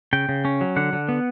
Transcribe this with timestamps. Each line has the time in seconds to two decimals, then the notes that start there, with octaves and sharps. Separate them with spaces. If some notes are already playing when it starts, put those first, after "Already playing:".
0.13 C#3 G5
0.29 C#3
0.45 C#4
0.61 F#3
0.76 D3 F#5
0.93 D3
1.09 B3